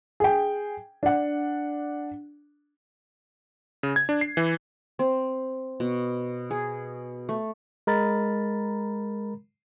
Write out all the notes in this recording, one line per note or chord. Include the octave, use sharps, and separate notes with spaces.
G#4 G5
D4 F#5
C#3
G#6
D4
C7
E3
C4
B2
G#4
A3
G#3 A#4 A#5 B5 A6